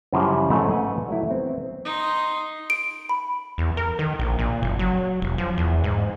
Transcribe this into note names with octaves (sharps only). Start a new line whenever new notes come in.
F#2 C#3 E3 F3 G3
G#2 C#3 A3 C4
B4 F#5 G#5
F#3 A3 E4
B3 C4
D#4 C6
D7
B5
E2
A#4
D#3
A#1
A#2
F#1
F#3
E1
F3
E2
G#2